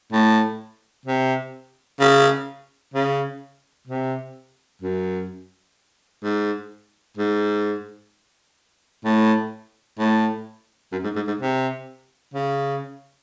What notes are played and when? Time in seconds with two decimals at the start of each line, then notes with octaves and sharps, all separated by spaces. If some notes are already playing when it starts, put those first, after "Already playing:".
0.12 A2
1.06 C3
2.00 C#3
2.94 C#3
3.88 C3
4.82 F#2
6.23 G#2
7.17 G#2
9.04 A2
9.98 A2
10.92 F#2
11.04 G#2
11.16 G#2
11.27 G#2
11.40 C3
12.34 C#3